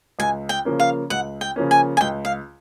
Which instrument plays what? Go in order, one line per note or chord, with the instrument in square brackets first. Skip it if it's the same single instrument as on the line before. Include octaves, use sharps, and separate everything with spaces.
[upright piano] C#2 [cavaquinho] G#5
[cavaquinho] G5
[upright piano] C#3 F3 A#3 C#4
[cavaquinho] F5
[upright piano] C#2 [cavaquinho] F#5
[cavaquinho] G5
[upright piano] C#3 F3 A#3 C#4
[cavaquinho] G#5
G#5
[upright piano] C#2 [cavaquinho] G5
[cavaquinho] F5